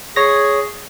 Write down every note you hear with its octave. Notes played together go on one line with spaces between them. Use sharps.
G#4 C#5 A#6